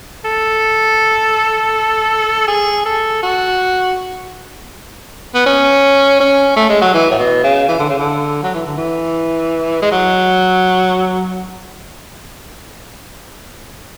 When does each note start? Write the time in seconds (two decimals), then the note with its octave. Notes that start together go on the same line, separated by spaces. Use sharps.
0.25 A4
2.48 G#4
2.86 A4
3.23 F#4
5.35 B3
5.46 C#4
6.20 C#4
6.56 A3
6.69 G#3
6.82 F#3
6.94 E3
7.11 A2
7.18 B2
7.43 C#3
7.68 E3
7.79 D3
7.89 C#3
7.99 D3
8.43 F#3
8.54 E3
8.66 D3
8.77 E3
9.82 G#3
9.92 F#3